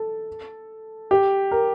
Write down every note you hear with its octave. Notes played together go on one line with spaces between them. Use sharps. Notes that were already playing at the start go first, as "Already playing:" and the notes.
Already playing: A4
G4
A#4